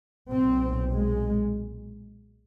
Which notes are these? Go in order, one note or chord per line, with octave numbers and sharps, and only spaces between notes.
B1 A#2 C4
G#3